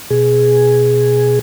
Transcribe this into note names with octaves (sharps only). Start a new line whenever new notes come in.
B2 G#4